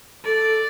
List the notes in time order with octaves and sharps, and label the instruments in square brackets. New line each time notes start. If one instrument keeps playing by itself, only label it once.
[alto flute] A4 [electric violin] D5